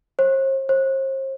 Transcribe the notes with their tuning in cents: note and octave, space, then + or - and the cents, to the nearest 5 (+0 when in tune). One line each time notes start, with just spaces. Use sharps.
C5 +45
C5 +40